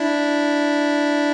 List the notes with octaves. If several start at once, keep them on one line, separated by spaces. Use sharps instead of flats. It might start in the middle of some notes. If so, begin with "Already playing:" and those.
Already playing: D4 E4